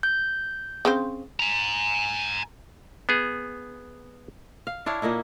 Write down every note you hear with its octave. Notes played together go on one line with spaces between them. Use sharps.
G6
C#3 C4 C5
G#5 A#5
B3 G#4
F5
D4 E4 C#5 F5
A#2 A#3 D#4 E4